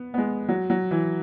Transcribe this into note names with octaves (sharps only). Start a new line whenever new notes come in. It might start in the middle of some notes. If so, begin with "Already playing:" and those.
Already playing: B3
B3
G#3
F#3
F#3
E3